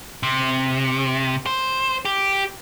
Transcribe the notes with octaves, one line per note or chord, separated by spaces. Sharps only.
C3
C5
G4